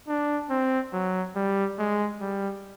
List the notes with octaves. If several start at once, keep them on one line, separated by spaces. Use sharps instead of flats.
D4
C4
F#3
G3
G#3
G3